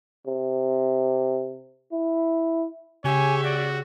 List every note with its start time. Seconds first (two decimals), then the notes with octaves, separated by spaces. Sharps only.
0.27 C3
1.92 E4
3.04 C#3 G4 C#5 E5 G#5
3.43 F#4 D5